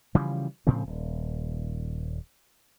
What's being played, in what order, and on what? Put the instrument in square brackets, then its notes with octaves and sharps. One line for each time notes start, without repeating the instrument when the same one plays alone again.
[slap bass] C#3 E3 F3 G3
A2 C#3 F3 C4
D#1